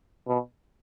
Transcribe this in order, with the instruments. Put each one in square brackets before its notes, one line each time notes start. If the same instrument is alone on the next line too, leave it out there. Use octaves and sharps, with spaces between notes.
[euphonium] B2